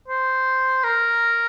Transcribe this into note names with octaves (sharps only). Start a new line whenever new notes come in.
C5
A#4